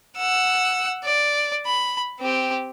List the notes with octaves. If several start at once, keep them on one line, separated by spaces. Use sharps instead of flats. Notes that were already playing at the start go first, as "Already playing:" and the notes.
F#5 E6
D5
B5
C4 G4